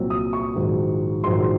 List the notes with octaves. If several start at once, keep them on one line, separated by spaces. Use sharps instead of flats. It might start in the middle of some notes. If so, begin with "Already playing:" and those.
Already playing: C2 A#2 F#3 C4
D#6
C#6
A#1 G#2 D#3 F#3
A#1 G#2 D#3 F#3 C6